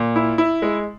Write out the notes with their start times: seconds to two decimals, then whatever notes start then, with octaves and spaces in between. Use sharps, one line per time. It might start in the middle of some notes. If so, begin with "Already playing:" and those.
Already playing: A#2
0.16 E4
0.38 E4
0.62 G#3